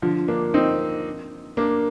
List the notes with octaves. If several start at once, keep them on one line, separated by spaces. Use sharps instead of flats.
D3 F3
A#3 D4
C4 D#4
A#3 D4